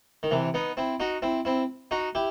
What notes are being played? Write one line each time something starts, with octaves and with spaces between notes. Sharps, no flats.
D#3
C3 E3
B3 D#4
C4 E4
D#4 F#4
C4 E4
C4 E4
D#4 F#4
E4 G4